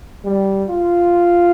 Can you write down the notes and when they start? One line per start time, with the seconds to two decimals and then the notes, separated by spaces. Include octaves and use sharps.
0.25 G3
0.68 F4